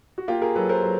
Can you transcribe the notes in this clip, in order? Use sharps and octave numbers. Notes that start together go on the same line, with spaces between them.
F#4
A#3 F4 G4
G#4 A#4
F#3 A4 B4
A#4 C5
F#3